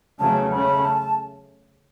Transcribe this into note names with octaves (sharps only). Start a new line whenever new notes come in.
E2 C#3 F#3 A3 C#4 A5
C#3 A3 C#4 B5
A5